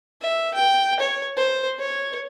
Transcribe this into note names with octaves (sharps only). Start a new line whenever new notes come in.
E5
G5
C#5
C5
C#5